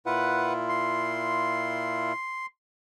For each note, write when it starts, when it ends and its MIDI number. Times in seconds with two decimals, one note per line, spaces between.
0.06 2.13 46
0.06 2.13 64
0.06 2.13 65
0.06 0.53 71
0.06 0.53 78
0.69 2.46 84